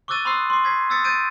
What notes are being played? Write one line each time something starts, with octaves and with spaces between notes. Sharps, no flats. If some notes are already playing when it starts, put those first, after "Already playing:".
C#6 D6 E6 F#6 A6 D#7
B5 C6 D#6 E6 F#6 C7
C6 D6 C7
C6 G#6 B6 C7
D#6 E6 F#6 A6 B6 C#7
G6 A6 D7 D#7